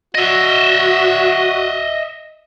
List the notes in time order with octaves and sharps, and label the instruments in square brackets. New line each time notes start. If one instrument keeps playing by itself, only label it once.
[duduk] F#4 [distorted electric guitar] D#5 E5